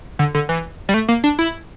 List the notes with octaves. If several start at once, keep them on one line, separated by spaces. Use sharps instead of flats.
D3
D3
E3
G3
A3
A#3
D4
E4